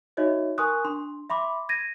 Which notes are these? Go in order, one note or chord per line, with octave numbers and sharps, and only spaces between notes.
D#4 F#4 C#5 D#5 E5
A#4 G#5 C6 C#6 D#6 F#6
D4 C6
E5 B5 C6 D6
G#6 A#6 D#7